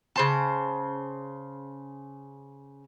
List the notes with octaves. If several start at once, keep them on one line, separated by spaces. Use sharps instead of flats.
C#3 C5 A5